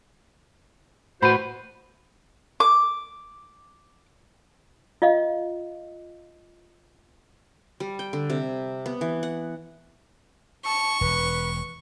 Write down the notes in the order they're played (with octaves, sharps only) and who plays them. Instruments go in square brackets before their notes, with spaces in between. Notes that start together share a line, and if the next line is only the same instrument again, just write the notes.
[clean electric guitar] A2 B4 [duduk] F#4 [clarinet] C5 [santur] B5
[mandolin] D6
[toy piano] F4 D#5 F5
[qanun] G3
G5
D3
C3
B3
E3
F#5
[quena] A5 [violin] C#6
[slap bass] E1 [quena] B4